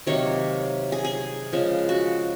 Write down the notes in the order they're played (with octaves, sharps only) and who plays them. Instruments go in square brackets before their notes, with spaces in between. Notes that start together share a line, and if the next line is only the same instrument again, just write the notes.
[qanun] C3 D#3 F#3 A#3 C#5
G#4
G#4
C#3 F3 G#3
F#4